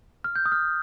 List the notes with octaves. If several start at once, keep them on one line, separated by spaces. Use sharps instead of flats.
F6
G6
D#6
F6